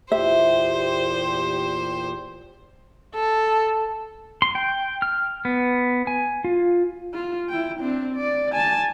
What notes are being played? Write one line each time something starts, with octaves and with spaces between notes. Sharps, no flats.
E2 A#2 G4 C5 E5
A4
C6
G5
F6
B3
G#5
F4
F4
E4 G5
C4 D4
D5
G#5 A5